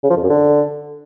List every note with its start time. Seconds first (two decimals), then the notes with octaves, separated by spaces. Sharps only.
0.04 C#3
0.10 F3
0.17 F2
0.23 F#2
0.30 D3